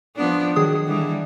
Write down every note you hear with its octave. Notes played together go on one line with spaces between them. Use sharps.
F3 B3 D4
D#3 F#3 G#4 D#6
D3 E3 G3